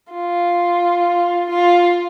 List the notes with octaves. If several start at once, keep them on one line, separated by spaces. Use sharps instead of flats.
F4
F4